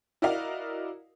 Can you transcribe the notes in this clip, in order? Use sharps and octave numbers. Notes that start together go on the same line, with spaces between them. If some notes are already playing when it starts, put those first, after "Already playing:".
E4 F#4 A#4 D5 D#5 F5